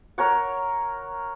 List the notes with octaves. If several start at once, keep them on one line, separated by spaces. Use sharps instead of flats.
A#4 C#5 F#5